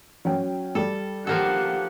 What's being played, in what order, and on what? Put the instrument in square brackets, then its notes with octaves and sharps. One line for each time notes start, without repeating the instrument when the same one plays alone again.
[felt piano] F#3 C#4 G5
[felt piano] G3 [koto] A4
[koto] F3 A#3 A4 [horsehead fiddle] G4 F#5